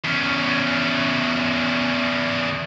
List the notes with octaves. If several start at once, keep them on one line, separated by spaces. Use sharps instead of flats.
E2 C#4